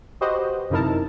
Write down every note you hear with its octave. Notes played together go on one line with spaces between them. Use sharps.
F#4 G4 B4 C5 D#5
F#2 C3 D#4 E4 A#4 A5